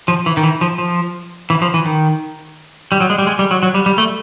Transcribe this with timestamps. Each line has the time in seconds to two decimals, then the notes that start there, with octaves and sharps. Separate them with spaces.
0.08 F3
0.26 E3
0.37 D#3
0.44 E3
0.61 F3
0.78 F3
1.50 E3
1.62 F3
1.74 E3
1.86 D#3
2.92 G3
3.00 F#3
3.10 G#3
3.18 G3
3.27 G#3
3.39 G3
3.51 F#3
3.63 F#3
3.74 G3
3.86 G3
3.98 A3